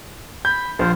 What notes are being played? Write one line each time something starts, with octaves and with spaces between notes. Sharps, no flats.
B5 G6
A#1 F4 C5